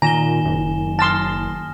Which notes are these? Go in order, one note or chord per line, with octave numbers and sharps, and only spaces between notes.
A#2 D#3 G#5 A#5 E7 G7
F#1
A5 C6 D#6 F6 A#6